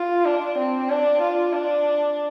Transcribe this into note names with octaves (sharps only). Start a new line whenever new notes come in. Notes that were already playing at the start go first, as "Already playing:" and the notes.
Already playing: F4
D4
C4
D4
F4
D4